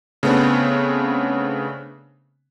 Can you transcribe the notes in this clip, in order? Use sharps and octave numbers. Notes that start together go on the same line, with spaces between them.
C#3 A3 B3 C4 D4